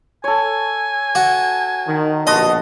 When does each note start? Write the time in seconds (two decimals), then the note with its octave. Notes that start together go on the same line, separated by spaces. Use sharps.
0.24 A4 C#5 G#5
1.15 F#4
1.87 D#3
2.27 A#1 B2 F#4 D#5 A5 C6